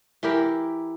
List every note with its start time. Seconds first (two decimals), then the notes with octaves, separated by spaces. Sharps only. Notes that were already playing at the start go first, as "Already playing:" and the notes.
0.23 E3 E4 G4 A#4